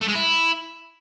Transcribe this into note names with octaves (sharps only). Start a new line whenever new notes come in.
A3
G#3
E4